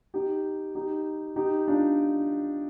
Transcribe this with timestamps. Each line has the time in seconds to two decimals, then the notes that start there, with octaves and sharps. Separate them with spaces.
0.14 D#4 G4
0.75 D#4 G4
1.36 D#4 G4
1.68 D4 F4